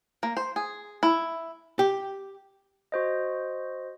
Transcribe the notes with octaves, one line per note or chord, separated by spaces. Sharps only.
A#3
C5
G#4
E4
G4
F#4 C5 D#5